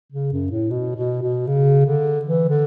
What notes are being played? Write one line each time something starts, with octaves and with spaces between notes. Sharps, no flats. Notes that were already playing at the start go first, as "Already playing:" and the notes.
C#3
F#2
A2
B2
B2
B2
C#3
D3
E3
D3